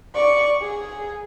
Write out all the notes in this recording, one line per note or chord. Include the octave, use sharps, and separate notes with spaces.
D5 C#6
G#4